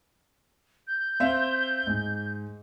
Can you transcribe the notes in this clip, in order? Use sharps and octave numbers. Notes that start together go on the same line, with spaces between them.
G6
C4 E5 F5
G#2